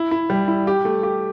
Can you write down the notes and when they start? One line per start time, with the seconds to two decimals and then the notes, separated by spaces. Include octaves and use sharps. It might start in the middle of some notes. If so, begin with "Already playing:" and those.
Already playing: E4
0.11 E4
0.30 G3
0.48 E4
0.67 G4
0.85 A3
1.03 G4